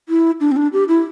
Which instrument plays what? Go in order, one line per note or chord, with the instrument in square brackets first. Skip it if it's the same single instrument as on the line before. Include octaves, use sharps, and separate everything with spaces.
[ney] E4
D4
C4
D4
G4
E4